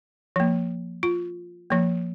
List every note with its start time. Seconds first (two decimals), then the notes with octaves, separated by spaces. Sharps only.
0.36 F3 A#3
1.03 F4
1.70 F3 A#3